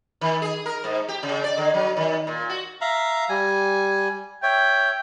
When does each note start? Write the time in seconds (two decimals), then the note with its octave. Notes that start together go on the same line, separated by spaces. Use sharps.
0.21 D#3
0.42 G#4
0.66 A#4
0.84 G#2
1.08 G4
1.23 C#3
1.44 D5
1.57 D3
1.74 F#3
1.97 D#3
2.27 A#2
2.49 F#4
2.81 E5 F5 A#5
3.29 G3 G#5
4.43 C#5 E5 G5